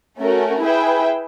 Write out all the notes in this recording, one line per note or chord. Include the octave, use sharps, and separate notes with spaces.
A3 C#4 F#4 A#4
E4 G#4 B4 E5 G5